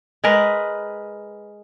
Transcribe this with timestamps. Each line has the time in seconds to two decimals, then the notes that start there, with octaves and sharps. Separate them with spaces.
0.24 G#3 G#4 A#4 B4